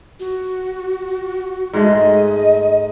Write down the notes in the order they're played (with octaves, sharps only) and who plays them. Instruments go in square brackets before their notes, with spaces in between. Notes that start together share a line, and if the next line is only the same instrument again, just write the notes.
[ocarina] F#4
[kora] G#2 G#3 A3 [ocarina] D#5